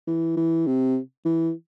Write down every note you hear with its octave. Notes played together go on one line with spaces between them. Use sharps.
E3
E3
C3
E3